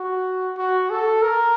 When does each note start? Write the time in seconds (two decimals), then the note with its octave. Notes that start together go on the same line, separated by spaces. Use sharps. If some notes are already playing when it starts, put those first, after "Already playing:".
Already playing: F#4
0.57 F#4
0.90 A4
1.22 A#4